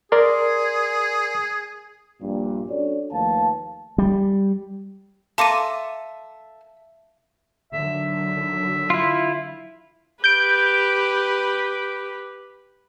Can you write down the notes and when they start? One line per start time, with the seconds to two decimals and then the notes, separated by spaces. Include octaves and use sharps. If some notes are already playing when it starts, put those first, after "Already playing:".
0.12 G#4 A#4 D5 C6
2.22 A#1 G2 A#2
2.70 C#4 D4 F#4 A4 C#5 D5
3.12 D#2 F3 A3 B4 F5 A5
3.98 G3
5.38 A4 E5 F5 A5 A#5 C6 D6 D#7
7.73 D3 D#3 F#3 E5
8.90 E4 F4
10.24 G4 B4 G6 D7